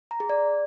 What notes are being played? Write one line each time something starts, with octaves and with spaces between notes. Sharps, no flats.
A#5
G#4
D5